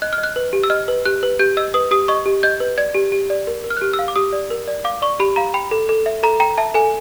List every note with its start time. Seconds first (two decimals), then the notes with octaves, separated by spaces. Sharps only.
0.02 D#5 F#6
0.13 F6
0.18 D#5
0.23 F#6
0.36 B4
0.53 G4
0.64 E6
0.70 D#5 F6
0.88 B4
1.05 G4 F#6
1.23 B4
1.39 G4 G6
1.57 D#5 E6
1.74 B4 D#6
1.91 G4 D#6
2.08 D#5 C#6
2.26 G4
2.43 D#5 G6
2.60 B4
2.78 D5 G#6
2.94 G4
3.12 G4
3.30 D5
3.47 A#4
3.64 A#4
3.70 F6
3.77 F#6
3.81 G4 F6
3.93 E6
3.99 F5
4.08 D6
4.16 G4 D#6
4.33 D5
4.50 A#4
4.68 D5
4.84 F5 D6
5.02 D5 C#6
5.20 G4 B5
5.36 F5 A#5
5.54 G5 B5
5.71 A4
5.89 A4
6.06 E5
6.23 A4 A#5
6.40 G5 A#5
6.58 E5 A5
6.74 A4 G#5